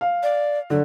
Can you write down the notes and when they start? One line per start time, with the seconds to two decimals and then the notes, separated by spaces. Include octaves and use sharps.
0.01 F5
0.23 D5
0.70 D3 F#3